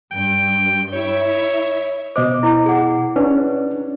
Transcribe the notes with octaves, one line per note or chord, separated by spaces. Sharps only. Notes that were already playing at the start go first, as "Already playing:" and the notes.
G2 G5
E4 C#5 E5
B2 C5 D#5 D6
E4
G#4 F#5
C#4 D4 B4